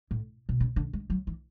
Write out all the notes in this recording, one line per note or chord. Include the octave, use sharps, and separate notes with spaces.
A2
B2
C#3
D3
G#3
F#3
E3